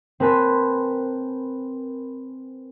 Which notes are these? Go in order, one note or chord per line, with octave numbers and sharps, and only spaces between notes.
C4 A#4 B4 G#5 A5 B6